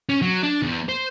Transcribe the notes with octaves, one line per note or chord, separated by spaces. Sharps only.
C#4
F#3
D4
E2
C5